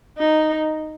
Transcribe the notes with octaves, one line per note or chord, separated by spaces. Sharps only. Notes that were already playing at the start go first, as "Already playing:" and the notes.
D#4